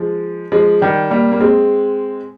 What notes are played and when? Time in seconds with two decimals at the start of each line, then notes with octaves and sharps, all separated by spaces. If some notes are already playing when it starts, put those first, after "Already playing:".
Already playing: F3 G#3
0.52 F3 G#3
0.81 D#3 G3
1.10 G3 A#3
1.32 A#3
1.40 G#3 C4